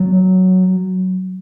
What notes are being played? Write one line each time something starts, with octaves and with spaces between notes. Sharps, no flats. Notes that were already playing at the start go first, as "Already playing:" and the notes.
Already playing: F#3